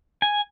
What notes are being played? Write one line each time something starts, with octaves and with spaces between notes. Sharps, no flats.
G#5